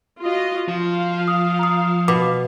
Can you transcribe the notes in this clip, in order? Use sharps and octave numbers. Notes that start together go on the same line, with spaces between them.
F4 F#4 D#5
F3 F5
D#6
A#5 D#6
B2 D6